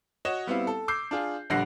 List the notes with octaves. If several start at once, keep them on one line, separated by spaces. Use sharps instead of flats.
F#4 C#5 D#5 E7
G3 B3 C4 E4 F5
A4
D6 E6 G6 C7
D4 F4 G#4
A#1 D3 G3 F#5 A#6 C7